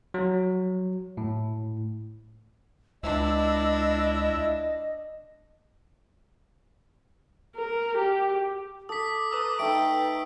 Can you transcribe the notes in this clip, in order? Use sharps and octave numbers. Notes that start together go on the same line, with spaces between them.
F#3
A2
C#2 D4 E4 D#5
A#4
G4
A4 D6 D#6 B6
B4 A5 A#5 D#6 E6
A3 D#4 G5 E6 D7